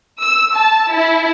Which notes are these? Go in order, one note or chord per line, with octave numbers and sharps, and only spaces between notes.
E6
A5
E4